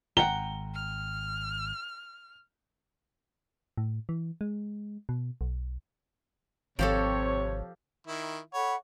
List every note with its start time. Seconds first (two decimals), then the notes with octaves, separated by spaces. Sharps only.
0.17 G#1 F#5 G5 A#5 G7
0.75 F6
3.78 A2
4.09 E3
4.41 G#3
5.09 B2
5.41 B1
6.79 G#1 C3 F3 C4 G4 A4 C#5
8.07 D#3 E4
8.54 A4 C#5 F#5 B5